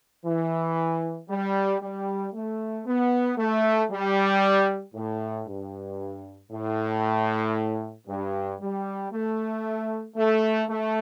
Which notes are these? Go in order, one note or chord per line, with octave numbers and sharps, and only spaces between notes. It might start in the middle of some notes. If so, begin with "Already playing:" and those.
E3
G3
G3
A3
B3
A3
G3
A2
G2
A2
G2
G3
A3
A3
A3